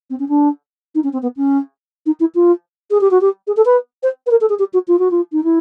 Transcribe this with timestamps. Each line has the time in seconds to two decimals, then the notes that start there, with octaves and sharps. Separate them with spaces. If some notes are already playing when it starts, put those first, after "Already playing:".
0.10 C4
0.19 C#4
0.28 D4
0.95 D#4
1.03 C#4
1.13 C4
1.22 B3
1.36 C#4
2.06 D#4
2.20 E4
2.35 F4
2.90 G#4
3.01 G4
3.11 F#4
3.21 G4
3.47 G#4
3.56 A4
3.65 B4
4.03 C5
4.26 B4
4.31 A#4
4.41 A4
4.49 G#4
4.59 G4
4.73 F#4
4.88 F4
4.99 F#4
5.11 F4
5.32 D#4
5.44 E4